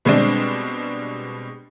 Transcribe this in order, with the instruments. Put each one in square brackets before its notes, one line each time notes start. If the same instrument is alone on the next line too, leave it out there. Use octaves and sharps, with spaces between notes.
[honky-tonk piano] B2 G3 G#3 C4 D4